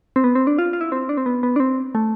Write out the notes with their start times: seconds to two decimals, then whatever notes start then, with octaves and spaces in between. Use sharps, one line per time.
0.16 C4
0.24 B3
0.35 C4
0.47 D4
0.58 F4
0.73 F4
0.81 E4
0.92 C4
1.09 D4
1.17 C4
1.26 B3
1.43 B3
1.56 D4
1.60 C4
1.95 A3